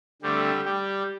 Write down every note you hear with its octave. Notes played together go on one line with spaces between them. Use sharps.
D3 G3 A3 C4 G4
G3 G4